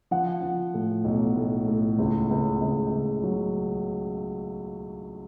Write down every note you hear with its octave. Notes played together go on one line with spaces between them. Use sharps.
F3 F#5
F3
A2
B1
A2
A2
C#2
C#2
C#2
C#2
F#3